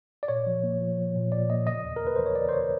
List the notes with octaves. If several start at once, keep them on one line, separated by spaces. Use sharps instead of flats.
D5
A#2 C#5
F3
A#3
F3
F3
A#2
A#2 D5
A#3 D#5
C#3 D#5
D#2
D#2 A#4
B4
E3 C5
C#5
E3 D5
C5
C#3 C#5